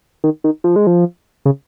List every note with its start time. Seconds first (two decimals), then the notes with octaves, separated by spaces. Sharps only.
0.24 D#3
0.44 D#3
0.64 F3
0.76 G#3
0.87 F3
1.46 C#3